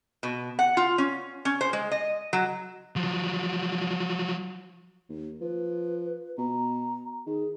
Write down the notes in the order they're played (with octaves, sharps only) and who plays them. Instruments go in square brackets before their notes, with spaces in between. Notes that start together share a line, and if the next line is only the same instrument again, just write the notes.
[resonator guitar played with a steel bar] B2
F#5
F4
C#4
C#4
C5
G#3
D#5
F#3
[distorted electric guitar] F3 F#3
[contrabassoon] D#2
[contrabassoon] F3 [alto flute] B4
[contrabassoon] B2 [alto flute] A#5
[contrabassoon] D#3 [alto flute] G#4